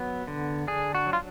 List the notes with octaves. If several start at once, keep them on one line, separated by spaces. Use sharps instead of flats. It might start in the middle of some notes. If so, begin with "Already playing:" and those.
Already playing: F#3 B3
D3
D4 G#4
F#4
F#3
F4